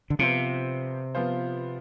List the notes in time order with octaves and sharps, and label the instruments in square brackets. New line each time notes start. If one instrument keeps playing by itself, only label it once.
[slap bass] D3
[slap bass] C3 [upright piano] F3 B3 F4 C5
[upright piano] F3 B3 F4 C5